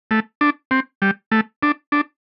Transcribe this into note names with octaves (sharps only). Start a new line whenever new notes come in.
A3
D4
C4
G3
A3
D4
D4